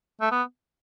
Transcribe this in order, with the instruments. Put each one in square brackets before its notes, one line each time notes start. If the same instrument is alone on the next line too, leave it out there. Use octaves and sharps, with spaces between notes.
[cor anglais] A3
B3